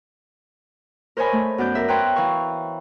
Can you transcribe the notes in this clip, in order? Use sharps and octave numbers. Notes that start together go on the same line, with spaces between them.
A#4 C5 C#5 D#5 G#5 B5
A3
F#2 B3 D5 G6
A#4 E5
B4 C#5 G5 A#5 C6
E3 F5 C#6